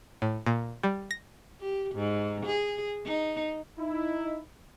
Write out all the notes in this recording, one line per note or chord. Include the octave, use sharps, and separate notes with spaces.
A2
A#2
G3
A#6
G4
G#2
G#4
D#4
D#4 E4